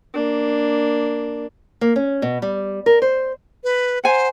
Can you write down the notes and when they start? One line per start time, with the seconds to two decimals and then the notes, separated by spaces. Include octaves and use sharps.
0.14 A#3 D4
1.81 A#3
1.96 C#4
2.22 B2
2.42 G3
2.86 A#4
3.02 C5
3.64 B4
4.04 C5 F#5 G#5 A#5